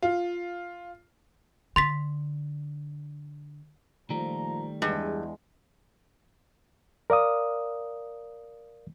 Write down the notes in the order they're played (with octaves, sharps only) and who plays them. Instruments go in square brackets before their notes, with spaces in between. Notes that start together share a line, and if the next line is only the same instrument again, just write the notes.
[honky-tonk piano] F4
[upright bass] D3 [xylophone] C6 A6 B6
[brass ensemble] A#2 F3 A#5 [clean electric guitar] D#3 G3 A3
[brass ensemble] E2 [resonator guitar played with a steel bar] G2 [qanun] G#3
[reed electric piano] A#4 D5 F5 D#6